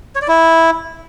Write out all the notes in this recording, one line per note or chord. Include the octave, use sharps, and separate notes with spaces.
C#5
D5
E4